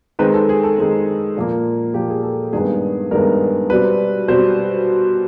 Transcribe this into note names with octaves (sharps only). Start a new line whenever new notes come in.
D#3 G#3 C4 B4
A4
G#4
A4
D#3 G#3 C4
A#2 F3 A#3
A#2 F3 A#3 G4
G#4
A4
G2 D#3 G#3 B3 G#4
G2 D#3 G#3 B3 A#4
B2 G3 C4 B4
B2 G3 C4 C5